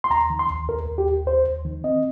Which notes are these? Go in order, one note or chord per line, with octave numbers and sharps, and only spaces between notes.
C6
D#2 A#5
D#3
C6
D#2
D#2 A#4
D#2
G4
D#2
D#2 C5
D#2
D#3
C4 D#5